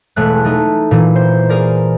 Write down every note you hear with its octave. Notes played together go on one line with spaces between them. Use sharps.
E1 G#3 A3 F#6
A3 D#4
A#2 E3
C5
G#4 A#4 D5